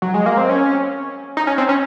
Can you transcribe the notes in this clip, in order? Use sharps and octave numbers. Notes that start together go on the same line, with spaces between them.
F#3
G#3
A#3
C4
C#4
D#4
C#4
C4
C#4